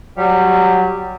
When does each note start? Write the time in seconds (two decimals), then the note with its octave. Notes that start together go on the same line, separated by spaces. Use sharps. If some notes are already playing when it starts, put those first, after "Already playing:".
0.18 F#3 G3